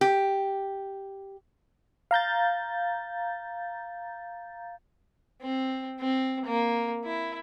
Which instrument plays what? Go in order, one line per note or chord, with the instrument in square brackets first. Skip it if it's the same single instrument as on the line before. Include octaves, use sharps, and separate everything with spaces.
[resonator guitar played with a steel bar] G4
[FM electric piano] F5 A#5 G6 A6
[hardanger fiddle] C4
C4
A#3
E4